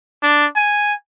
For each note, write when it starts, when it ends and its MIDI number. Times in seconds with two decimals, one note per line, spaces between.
0.23 0.46 62
0.56 0.94 80